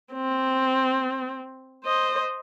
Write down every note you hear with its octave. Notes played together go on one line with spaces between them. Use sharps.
C4
C5 D#5